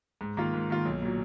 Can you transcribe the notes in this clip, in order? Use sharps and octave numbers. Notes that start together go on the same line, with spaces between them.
G#2
D#3 A#3 F4
G#2
D#3 A#3 F4
B1
A#2 F#3